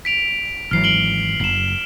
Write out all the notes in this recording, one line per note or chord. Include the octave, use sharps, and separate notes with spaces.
B6 D7 F7
G#1 E3 F#3 F6 C7
D7 F#7 G7
F#1 C7 E7